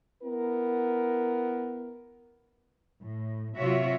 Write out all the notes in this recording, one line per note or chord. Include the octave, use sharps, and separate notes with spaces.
B3 E4 A#4
A2
C3 F#3 F4 F#4 C#5 E5